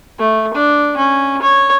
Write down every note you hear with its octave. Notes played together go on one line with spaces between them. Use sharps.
A3
D4
C#4
C#5